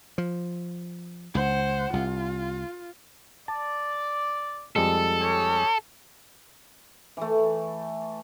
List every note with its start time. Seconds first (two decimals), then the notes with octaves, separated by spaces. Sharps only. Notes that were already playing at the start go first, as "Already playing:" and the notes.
0.18 F3
1.35 C#2 C5 F#5
1.93 C2 F4
3.48 D5 A5
4.76 F2 G3 G#3 A4
5.20 G4 G#4 C#5
7.17 E3 A3